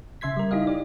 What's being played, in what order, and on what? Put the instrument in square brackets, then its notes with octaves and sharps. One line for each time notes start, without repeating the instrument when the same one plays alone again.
[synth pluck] C#3 E5 C6 G#6 B6
G3 A#4
D#4 E4 G4 D#5 F5
G4 D5